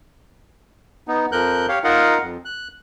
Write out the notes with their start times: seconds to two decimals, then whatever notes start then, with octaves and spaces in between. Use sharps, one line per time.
1.08 B3 D#4
1.32 F2 F3 A#4 F#6 G6
1.68 G4 C#5 F5
1.84 D#4 F4 A#4 D#5 F5 F#5
2.22 F2
2.45 F#6